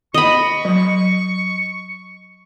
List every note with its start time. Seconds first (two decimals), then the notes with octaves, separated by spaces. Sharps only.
0.14 D#5 B5 C#6
0.65 F#3